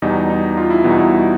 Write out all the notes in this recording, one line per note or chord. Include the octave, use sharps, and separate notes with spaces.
E2 B2 G3 D#4
D#4
F4
E4
E2 B2 G3 D#4
E4